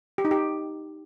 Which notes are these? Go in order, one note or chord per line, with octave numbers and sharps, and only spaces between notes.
G4
D#4
G4